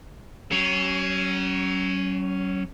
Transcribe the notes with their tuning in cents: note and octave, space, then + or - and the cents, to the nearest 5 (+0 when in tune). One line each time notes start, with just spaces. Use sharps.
F#3 +35 C#4 +0